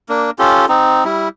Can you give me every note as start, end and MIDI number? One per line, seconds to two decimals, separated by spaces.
0.09 0.31 58
0.09 0.31 62
0.39 0.66 61
0.39 0.66 65
0.39 0.66 67
0.39 0.66 69
0.69 1.04 60
0.69 1.04 63
1.05 1.29 55
1.05 1.29 64